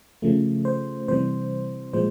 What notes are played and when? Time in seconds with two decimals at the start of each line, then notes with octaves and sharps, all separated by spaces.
0.22 C#3 F3 A3
0.65 C5
1.08 C3 E3 G3 C5
1.93 A#2 F3 G#3 C5